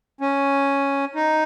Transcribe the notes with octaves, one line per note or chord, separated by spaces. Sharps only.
C#4
D#4